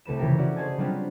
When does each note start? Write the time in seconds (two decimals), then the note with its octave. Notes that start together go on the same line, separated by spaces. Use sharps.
0.05 C2 A3 B4 E7
0.19 C#3 E3 F4 G4 A#4
0.38 C#4 E4 F#4 D5
0.56 G#4 C5 C#5 D#5 G#5 A5
0.77 F#3 G3 C4 D4 F4 G4